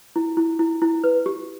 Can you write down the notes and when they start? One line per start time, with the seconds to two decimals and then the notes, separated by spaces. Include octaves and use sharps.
0.16 E4
0.37 E4
0.59 E4
0.82 E4
1.04 B4
1.26 G4